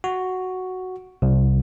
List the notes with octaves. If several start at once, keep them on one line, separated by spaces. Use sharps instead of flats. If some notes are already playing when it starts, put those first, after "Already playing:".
F#4
C2